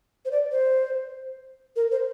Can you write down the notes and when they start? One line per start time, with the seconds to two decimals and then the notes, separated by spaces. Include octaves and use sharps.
0.25 C5
0.31 D5
0.52 C5
1.76 A#4
1.91 C5